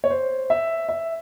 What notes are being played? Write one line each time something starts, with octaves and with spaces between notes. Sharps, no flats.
C#5
C5
E5
E5